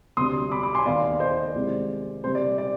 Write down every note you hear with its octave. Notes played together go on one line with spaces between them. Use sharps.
D2 C3 G3 D4 C6 D#6
B5 D6
B5 D6
G#5 C6
D#2 D#3 B3 D5 F5
C5 D#5
C5
D5
C2 C3 D#3 G#3
C3 G3 C4 C5
D5
D5